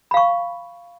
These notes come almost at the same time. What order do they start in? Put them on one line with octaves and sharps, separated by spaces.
B5 F5 C#6